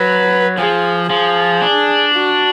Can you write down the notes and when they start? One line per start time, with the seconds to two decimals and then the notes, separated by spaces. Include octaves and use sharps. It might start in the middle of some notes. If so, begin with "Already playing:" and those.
Already playing: F#3 B4
0.58 F3 G#4
1.10 F3 G#4
1.62 D4
2.14 F#4